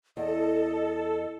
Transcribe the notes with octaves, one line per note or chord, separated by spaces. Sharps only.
E2 A4 D#5